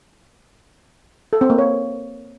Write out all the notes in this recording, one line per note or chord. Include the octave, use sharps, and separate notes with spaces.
A4
C4
A#3
C#5